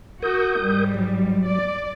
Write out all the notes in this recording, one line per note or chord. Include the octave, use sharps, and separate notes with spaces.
F#4 A#4 D#6 G6
G#2 G3
F#3
D5